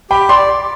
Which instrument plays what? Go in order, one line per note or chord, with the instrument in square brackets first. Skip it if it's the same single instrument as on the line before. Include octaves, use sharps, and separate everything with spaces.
[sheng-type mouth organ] G4 [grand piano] G5 B5
[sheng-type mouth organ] D5 [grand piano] C6